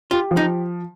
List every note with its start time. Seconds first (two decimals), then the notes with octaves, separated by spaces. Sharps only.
0.11 F4 G4
0.31 F3
0.37 D#4